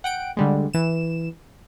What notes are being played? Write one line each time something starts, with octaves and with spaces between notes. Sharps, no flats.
F#5 G5 D7
D3 G3 G#3
E3 E7